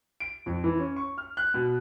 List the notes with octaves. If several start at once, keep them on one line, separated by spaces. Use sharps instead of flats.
D7
F2
E3
C#4
C#6
F6
F#6
B2